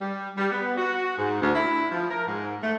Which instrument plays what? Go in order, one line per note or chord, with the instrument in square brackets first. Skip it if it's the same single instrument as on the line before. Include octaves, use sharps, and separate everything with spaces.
[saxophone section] G3
G3
B3
F#4
G#2
D2
E4
F3
A#4
G#2
A3